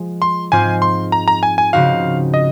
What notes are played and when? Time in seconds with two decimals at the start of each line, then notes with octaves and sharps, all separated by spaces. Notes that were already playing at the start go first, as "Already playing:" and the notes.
Already playing: F3 G#3
0.22 C6
0.52 G#2 F3 C4 F4 C5 G#5
0.82 C6
1.12 A#5
1.28 A#5
1.43 G#5
1.58 G#5
1.73 C#3 F3 C4 D#4 F#4 F5
2.34 D#5